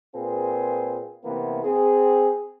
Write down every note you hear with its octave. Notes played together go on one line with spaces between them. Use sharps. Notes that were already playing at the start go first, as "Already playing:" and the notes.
A#2 C4 F4 G#4 B4
C3 E3 A#3 B3 E4
C4 G#4